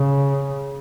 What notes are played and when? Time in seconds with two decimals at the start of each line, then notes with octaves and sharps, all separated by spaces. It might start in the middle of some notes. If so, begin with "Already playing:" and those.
Already playing: C#3